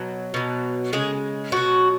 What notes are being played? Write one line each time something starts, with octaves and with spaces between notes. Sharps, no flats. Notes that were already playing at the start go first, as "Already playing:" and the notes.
Already playing: B2 F#3
B2 F#3
C#3 G#3 G#4
B2 F#3 F#4